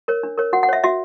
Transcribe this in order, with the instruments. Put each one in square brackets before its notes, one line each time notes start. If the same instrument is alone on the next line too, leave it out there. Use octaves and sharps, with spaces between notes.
[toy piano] A#4 C#5
D4
A#4 C#5
F#4 F#5
F#5
C#5 E5
F#4 E5